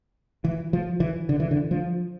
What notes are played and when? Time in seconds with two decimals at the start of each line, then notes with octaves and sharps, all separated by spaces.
0.44 E3
0.73 F3
1.00 E3
1.29 D3
1.40 E3
1.51 D3
1.71 F3